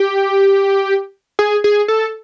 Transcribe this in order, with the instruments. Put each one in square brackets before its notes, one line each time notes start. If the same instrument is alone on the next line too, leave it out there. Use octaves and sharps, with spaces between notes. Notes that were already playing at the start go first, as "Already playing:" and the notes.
Already playing: [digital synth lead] G4
G#4
G#4
A4